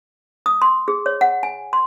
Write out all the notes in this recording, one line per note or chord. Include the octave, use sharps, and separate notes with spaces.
D#6
C6
G#4
C#5
F#5
G#5
C6